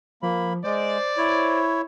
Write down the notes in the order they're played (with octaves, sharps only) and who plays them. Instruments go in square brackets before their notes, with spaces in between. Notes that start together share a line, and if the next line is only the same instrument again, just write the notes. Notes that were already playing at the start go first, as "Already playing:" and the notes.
[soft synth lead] F3 [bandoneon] A#3 B5
[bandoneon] G#3 [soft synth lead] C5 [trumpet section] D5
[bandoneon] E4 C#5